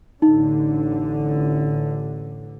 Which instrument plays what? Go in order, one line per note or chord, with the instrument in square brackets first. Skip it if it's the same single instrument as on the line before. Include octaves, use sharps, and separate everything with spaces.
[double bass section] A1 D3 [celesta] D#4